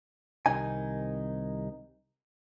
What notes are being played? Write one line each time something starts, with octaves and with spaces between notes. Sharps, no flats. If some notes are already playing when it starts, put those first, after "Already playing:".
C2 C3 D#3 D#4 G#5